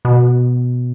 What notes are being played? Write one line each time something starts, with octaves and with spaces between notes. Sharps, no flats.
B2